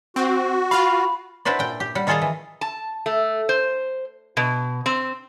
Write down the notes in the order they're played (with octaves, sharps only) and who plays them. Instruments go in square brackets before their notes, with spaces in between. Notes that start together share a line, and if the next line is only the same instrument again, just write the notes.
[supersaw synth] C4 [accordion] F#4
[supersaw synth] F4 F5 [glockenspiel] B5
[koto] D4 E4 F#4 B4 C5 D5
A#2 G5
G4
G3 F#5
D#3 F4 G#4 A4 D#5 F5
E3
[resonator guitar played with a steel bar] A5
A3
C5
B2
C4